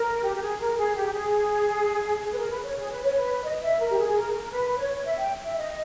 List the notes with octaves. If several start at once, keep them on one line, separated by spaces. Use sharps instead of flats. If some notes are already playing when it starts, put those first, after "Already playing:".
Already playing: A#4
G4
G4
G#4
A#4
G#4
G4
G#4
B4
A#4
B4
C#5
G#4
B4
C#5
B4
D#5
E5
A#4
G4
G#4
A#4
A#4
B4
C#5
E5
G5
E5
D#5